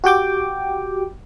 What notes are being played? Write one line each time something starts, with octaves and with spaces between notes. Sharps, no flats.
F#4 G4 G5 D6